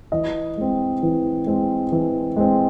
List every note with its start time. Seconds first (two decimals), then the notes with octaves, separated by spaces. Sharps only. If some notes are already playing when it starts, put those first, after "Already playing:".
0.12 E3 D#5
0.57 G#3 C4
1.03 E3
1.46 G#3 C4
1.92 E3
2.36 G#3 C4